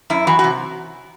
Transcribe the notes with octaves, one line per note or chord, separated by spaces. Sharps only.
F#2 E4
E3 F#4
C3 F#4